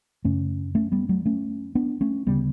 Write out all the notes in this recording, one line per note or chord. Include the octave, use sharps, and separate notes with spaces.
F#2 C#3 A3 C#4
A3 C#4
G3 B3
F#3 A3
A3 C#4
B3 D4
A3 C#4
D2 C#3 G3 B3